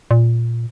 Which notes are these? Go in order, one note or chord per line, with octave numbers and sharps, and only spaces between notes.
A#2